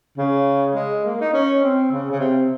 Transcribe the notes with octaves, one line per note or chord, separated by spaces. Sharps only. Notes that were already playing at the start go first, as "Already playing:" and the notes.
C#3
G#3
A#3
D#4
C#4
C4
C#3
C#3
C3